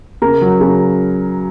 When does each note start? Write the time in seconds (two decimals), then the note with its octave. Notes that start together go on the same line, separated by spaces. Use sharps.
0.22 C#3 A#4 A#5
0.41 F#3
0.61 C#3